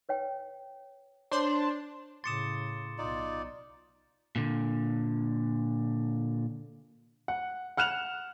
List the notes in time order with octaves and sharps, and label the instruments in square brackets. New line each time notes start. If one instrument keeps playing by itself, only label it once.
[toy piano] B4 C#5 G5
[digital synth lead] D4 [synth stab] C5 C6 [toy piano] C#5
[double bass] A2 C#3 [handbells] C6 D6 D#6 [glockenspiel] A6 C#7 E7
[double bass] B1 [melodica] D#4 F4 D5
[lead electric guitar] A#2 D3
[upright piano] F#5
F#5 F6 F#6 E7 F7